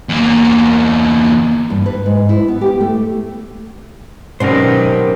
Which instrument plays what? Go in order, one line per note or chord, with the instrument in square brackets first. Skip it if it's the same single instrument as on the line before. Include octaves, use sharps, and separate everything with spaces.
[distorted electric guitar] E2 A#3
[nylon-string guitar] G2
B4
G#2
E4
B3
G4
A3
[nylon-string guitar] B2 C#4 D5 [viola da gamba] D#3 F#3 G4 [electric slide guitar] A#4 C5